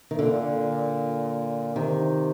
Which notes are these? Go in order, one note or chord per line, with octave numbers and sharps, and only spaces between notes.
D#3
A#2 D3
C3 D#3